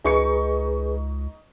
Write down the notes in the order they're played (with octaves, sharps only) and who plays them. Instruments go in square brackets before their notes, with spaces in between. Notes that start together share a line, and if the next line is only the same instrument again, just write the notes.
[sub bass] C#2 [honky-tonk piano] D#4 C#6 C#7 [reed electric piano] G#4 B4